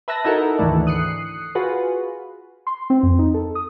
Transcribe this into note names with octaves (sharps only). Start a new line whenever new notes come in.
B4 E5 A5 E6 F#6 A#6
D#4 E4 F#4 A4 A#4
D2 G#2 D#3 E3 A3 D4
D#6 F#6 C7 C#7
F4 F#4 G#4 B4
C6
C4
F2
D#4
A4
D#6